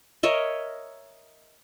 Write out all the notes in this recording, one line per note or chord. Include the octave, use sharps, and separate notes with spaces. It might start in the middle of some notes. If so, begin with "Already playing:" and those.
A#4 C#5 D#5 E5